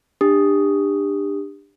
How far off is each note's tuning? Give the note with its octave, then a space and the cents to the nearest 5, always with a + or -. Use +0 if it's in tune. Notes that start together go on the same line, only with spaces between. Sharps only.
D4 +20 G4 +25 D#6 +0